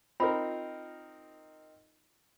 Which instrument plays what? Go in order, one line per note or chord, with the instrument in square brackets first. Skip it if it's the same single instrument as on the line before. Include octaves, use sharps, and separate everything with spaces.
[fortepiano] C4 D#4 A#4 [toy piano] F4 B5